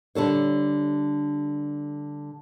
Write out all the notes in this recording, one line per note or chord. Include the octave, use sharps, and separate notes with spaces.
D3 G3 A4 C#5